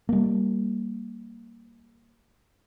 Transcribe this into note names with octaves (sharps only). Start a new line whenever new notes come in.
G3 A#3